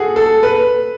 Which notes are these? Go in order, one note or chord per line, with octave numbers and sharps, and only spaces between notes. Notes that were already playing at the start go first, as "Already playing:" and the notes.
Already playing: F#4 G#4 A4
A4
B4